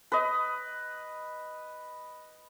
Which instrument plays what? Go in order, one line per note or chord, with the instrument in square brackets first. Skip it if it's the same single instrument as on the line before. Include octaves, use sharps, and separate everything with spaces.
[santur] B4 D#5